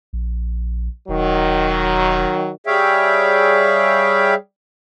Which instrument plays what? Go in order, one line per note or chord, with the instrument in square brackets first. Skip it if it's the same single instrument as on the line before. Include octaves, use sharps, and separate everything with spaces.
[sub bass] A#1
[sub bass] E1 [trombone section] D#3 F#3
[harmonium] G3 G#4 C#5 E5 F5 G5